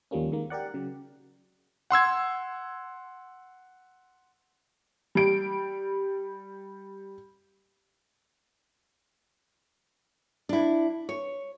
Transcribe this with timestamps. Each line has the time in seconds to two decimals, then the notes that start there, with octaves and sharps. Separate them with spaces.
0.11 D#2 F3 G3 A#3 C#4
0.32 D#2 D#3 G#3 A#3
0.50 G4 A#4 D5 F#5
0.74 C#3 F#3
1.90 F#5 C6 E6 G#6
5.15 G3 D7
10.49 D4 E4
11.09 C#5